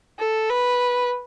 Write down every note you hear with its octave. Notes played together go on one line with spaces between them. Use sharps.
A4
B4